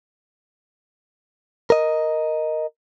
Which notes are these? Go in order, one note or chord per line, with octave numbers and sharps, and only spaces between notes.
A#4 D#5